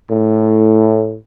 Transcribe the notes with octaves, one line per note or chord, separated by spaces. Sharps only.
A2